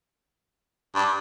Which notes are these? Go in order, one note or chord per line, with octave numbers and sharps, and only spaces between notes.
G2